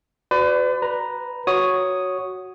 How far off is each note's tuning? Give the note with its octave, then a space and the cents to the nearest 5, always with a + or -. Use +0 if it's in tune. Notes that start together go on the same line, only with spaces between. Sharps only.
F#4 +0 B4 +40 D5 +0
B4 +0 A#5 +0
F#4 +0 C#5 +0 D#6 +0